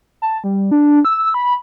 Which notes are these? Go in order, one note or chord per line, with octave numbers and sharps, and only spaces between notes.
A5
G3
D4
E6
B5